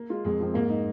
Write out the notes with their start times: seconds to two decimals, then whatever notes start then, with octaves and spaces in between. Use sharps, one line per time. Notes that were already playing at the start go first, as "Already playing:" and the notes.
Already playing: A#3
0.09 G#3 F4
0.25 F2 G#3
0.40 F3 C4
0.54 G#2 A#3
0.69 G#3 D#4